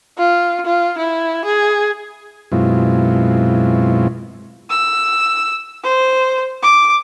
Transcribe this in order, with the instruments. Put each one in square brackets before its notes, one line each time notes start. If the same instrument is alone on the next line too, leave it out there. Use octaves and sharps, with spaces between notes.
[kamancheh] F4
F4
E4
G#4
[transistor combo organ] F#2 B2 G#3 C4 E4 F4
[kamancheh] E6
C5
D6